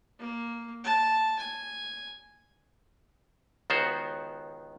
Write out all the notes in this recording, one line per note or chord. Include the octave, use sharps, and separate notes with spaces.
A#3
A5
G#5
C#2 D#3 B3 F#4 C5 C#5